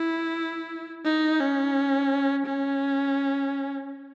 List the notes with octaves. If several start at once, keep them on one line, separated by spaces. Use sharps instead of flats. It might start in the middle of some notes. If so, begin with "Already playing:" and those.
Already playing: E4
D#4
C#4
C#4